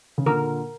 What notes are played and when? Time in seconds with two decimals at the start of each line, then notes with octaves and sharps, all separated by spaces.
0.18 C#3
0.26 A#2 D3 A#4